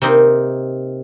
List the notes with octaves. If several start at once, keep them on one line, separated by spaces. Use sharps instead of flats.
C3 A#3 C4 D#4